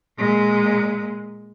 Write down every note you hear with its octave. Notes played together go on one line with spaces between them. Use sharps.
A#2 G#3